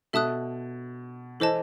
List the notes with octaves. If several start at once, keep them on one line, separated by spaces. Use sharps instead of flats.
B2 A4 E5 A5 D#6 F#6
E3 A4 C5 D#5 A5